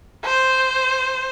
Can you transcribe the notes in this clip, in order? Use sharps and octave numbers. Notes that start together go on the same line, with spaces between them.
C5